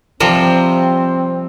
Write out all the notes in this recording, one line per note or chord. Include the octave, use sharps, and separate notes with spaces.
C3 F3 G3 C4